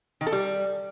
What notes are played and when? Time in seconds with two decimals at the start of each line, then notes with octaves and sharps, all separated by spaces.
0.21 D#3
0.27 A4
0.32 G3